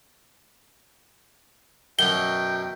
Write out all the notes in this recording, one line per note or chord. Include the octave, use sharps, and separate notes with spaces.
F#2 B2 F#3 G5 G7